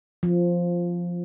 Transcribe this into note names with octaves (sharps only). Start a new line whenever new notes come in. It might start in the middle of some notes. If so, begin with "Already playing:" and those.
F3